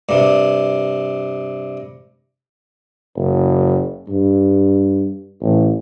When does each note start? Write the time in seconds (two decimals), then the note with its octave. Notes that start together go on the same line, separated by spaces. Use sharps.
0.09 G2 C3
3.16 F#1
4.08 G2
5.42 A1